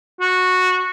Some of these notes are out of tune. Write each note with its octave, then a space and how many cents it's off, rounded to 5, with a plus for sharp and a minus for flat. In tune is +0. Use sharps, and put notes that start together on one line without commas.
F#4 -10